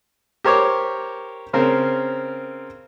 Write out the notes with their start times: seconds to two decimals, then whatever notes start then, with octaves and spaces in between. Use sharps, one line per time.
0.44 G4 A#4 C5 C#5 D6
1.53 C#3 C4 A#4